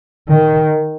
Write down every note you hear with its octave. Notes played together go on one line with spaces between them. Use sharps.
D#3